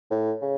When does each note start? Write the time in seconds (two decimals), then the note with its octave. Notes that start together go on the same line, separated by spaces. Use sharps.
0.11 A2
0.42 C#3